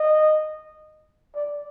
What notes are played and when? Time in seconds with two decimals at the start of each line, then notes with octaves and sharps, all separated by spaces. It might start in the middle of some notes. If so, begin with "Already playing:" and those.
Already playing: D#5
1.35 D5